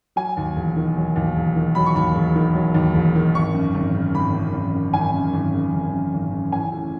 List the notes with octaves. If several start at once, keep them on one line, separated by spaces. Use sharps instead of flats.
F#3 G#5
D#2
E1
D#3
F#3
D#2
E1
D#3
F#3 B5
C#6
D#2 B5
E1
D#3
F#3
D#2
E1
D#3
G#1 C#6
F#2
G#1
C#3
G#1 B5
F#2
G#1
C#3
G#1 G#5
F#2
G#1
C#3
G#1
F#2
G#1
C#3
A1 G#5
A2